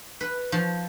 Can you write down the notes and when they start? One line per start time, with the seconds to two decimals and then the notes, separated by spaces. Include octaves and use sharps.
0.21 B4
0.52 F3